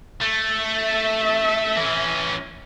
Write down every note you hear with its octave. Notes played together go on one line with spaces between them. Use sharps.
A3
E5
E3 C#4